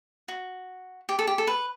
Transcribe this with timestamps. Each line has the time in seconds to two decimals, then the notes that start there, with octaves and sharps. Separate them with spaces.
0.28 F#4
1.09 G4
1.19 A4
1.27 G4
1.38 A4
1.47 B4